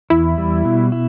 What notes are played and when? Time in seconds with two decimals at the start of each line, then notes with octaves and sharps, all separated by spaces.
0.10 E2 E4
0.38 G3
0.65 B2
0.92 E4